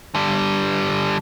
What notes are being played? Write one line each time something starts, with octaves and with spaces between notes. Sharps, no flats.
D3 G3